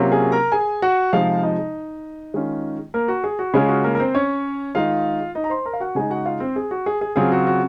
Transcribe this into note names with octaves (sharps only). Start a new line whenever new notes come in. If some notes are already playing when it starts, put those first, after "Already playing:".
Already playing: C3 F#3 A#3 C#4 F4
G#4 G#5
A#4 A#5
G#4 G#5
F#4 F#5
C3 F3 G#3 D#4 F4 F5
D#4 D#5
D#3 G#3 C#4 F4
A#3 A#4
F#4
G#4
F#4
C#3 G#3 C#4 F4 G#4
F#4
A#3 A#4
A#4
C4 C5
C#4 C#5
D#3 G#3 D#4 F4 F5
D#4 D#5
A#5
C5 C6
A#4 A#5
F5
F#4 F#5
C#3 G#3 D#4 G#4 G#5
F#4 F#5
F4 F5
C4 C5
G#4
F#4
G#4
G#4
C#3 F#3 C4 F4 G#4
F#4
F#4